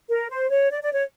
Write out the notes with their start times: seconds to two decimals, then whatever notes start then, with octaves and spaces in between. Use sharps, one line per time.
0.09 A#4
0.29 C5
0.50 C#5
0.72 D5
0.82 D5
0.92 C#5